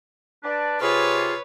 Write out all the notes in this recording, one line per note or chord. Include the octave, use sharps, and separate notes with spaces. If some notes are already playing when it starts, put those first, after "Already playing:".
D4 B4 D5
C3 F4 G#4 B4 C#5